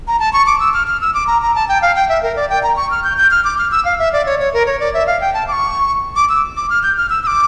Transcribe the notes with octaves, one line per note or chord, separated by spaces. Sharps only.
A#5
A5
C#6
D6
E6
F6
F6
E6
D6
A#5
A#5
A5
G5
F5
G5
E5
A#4
D5
G5
A#5
C#6
F6
G6
G6
F6
D6
F6
E6
F5
E5
D5
C#5
C#5
A#4
C#5
D5
E5
F5
G5
A5
D6
C#6
D6
E6
D6
F6
G6
F6
E6
E6
D6